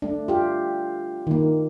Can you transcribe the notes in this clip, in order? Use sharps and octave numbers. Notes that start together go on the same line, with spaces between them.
A3 D4
F4 G4
D#3 A#3